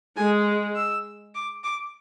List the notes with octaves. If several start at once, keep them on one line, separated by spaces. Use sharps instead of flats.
G#3 G#5
E6
D6
D6